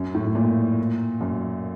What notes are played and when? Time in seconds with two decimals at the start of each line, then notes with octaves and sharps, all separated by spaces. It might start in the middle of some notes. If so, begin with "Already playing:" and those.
Already playing: F#2
0.14 A2
0.35 A#2
1.21 F#2